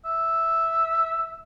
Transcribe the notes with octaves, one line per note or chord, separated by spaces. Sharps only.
E5